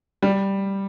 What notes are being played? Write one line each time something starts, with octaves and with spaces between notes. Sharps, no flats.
G3